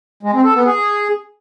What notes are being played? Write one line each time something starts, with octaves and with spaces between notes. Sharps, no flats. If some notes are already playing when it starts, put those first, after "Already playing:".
G#3
C4
A4
B3
G#4